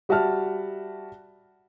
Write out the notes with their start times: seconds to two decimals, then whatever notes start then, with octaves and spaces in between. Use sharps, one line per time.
0.09 G3 F#4 E5 A5 F6